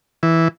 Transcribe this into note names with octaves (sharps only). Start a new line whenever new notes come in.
E3